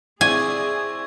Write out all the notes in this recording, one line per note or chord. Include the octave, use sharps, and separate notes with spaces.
C4 E4 G#4 D5 G#5 C#6 G#6